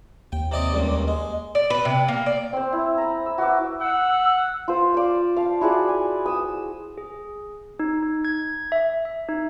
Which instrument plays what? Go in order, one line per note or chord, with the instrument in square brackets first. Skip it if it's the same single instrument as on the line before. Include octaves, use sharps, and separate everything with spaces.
[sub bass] D#2 [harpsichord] G5
[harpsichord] C3 D5 D#5
C#2 G2 A#2
G#3
[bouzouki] D5
B4
C3
A#3
D5
[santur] C4 C5
E4
A#5 B5
E6
F#4 B4 E5 D6
[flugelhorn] F#5 [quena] E6
[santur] F4 C5
D5 F5
F5 A5
E4 F#4 G#4 D5
G#5
D#6 E6
[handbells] G#4
D#4
D#4
G#6
E5
E5
D#4